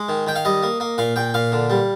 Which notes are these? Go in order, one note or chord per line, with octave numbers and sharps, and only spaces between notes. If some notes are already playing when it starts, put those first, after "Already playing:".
Already playing: G#3
D#3
D#3 G5
F5
G3 D#5
A#3
A#3
A#2 F5
A#2 G5
A#2 F5
D3
G3